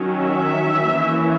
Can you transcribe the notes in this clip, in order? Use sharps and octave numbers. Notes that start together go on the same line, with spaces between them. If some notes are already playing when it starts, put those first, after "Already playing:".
Already playing: D#3 F#3 C#4
E5
E3 A#3 C#4